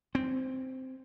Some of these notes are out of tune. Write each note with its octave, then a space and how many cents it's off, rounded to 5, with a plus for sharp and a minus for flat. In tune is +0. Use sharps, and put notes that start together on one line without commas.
C4 -5